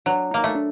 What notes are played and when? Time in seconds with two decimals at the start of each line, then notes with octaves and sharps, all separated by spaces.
0.06 F#3 D4
0.31 A#3 D#4
0.44 A3
0.55 D4